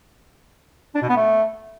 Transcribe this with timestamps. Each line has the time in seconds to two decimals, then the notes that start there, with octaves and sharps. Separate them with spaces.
0.95 D4
1.02 B2
1.09 B3
1.16 A3